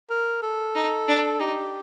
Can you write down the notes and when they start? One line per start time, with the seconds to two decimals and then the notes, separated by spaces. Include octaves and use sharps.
0.10 A#4
0.42 A4
0.75 D#4
1.08 D4
1.40 D#4 G4